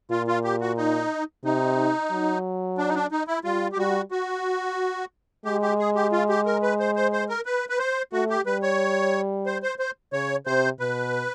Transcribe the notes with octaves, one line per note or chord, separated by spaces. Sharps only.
A#2 F4
F4
G4
F#4
D#4
C3 D#4
F#3
D4
D#4
D4
D#4
E4
G3 F4
G4
G3 F#4
F#4
G#3 G4
G4
G#4
G4
F4
G4
A#4
B4
C5
C5
C5
A#4
B4
B4
C5
A3 F#4
G4
G3 B4
C#5
C5
C5
C5
C#3 C#5
C3 C5
B2 B4